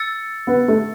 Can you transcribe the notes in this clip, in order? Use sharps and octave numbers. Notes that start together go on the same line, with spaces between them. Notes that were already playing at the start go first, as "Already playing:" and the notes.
Already playing: E6 A6 C#7
B3
A3